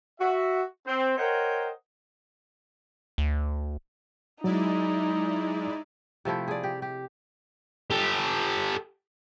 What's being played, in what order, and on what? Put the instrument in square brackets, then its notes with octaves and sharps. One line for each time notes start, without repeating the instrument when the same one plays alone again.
[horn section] F#4 E5
C4
A#4 C5 C#5 D#5 F#5 G5
[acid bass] D2
[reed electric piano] F#3 [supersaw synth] G#3 E4 D5 [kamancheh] D#4
[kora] C3 F3 A3 E4
G#4 D5
G4
G4
[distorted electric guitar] G4 A4